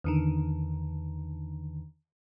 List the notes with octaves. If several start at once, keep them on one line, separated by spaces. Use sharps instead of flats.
E2 D3 D#3